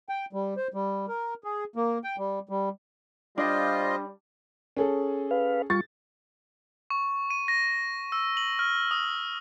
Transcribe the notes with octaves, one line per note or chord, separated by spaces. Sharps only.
G5
G3
C5
G3
A#4
G#4
A#3
G5
G3
G3
G3 D4 F4 C5 D#5
C#4 G#4 A4
B4 F5
G3 F4 C#6 A6
C#6
D#7
A#6
E6
F#7
F6
D#6